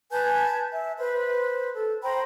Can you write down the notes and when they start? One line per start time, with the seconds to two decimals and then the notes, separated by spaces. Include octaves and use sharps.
0.11 B4 G#5 A5 G6
0.72 E5
0.99 B4 C5
1.74 A4
2.03 C5 G5 A#5 B5